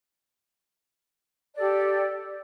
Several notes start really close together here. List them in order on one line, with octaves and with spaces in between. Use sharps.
D5 A4 G4